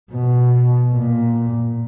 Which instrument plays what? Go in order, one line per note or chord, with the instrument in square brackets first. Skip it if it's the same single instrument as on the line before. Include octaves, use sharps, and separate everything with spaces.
[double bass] B2
A#2